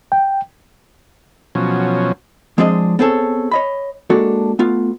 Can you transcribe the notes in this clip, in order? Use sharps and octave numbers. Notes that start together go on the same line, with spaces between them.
G5
B2 F3 F#3 C#4
F3 G#3 C4 D4 G#4 D#5
B3 C4 G#4 A4 C#5
C#5 D#5 B5
G#3 A#3 D4 F#4 A4
A3 B3 F4